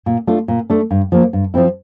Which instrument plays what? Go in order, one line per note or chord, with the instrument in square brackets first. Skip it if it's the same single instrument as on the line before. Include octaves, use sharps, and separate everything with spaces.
[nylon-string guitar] A#2
A3 D4 F4
A#2
A3 D4
G2
F3 A#3
G2
F3 C4 E4